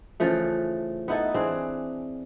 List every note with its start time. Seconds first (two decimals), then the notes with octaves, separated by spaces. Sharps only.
0.20 C#3 E3 F3 A3
1.08 B3 D#4 E4 A4
1.34 E3 C4 D4 G#4